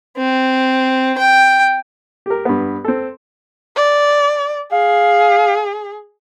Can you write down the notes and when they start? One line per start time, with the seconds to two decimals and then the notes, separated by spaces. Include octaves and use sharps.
0.17 C4
1.18 G5
2.26 G4 A#4
2.45 G2 B3
2.84 C4 A4
3.77 D5
4.72 G#4 F5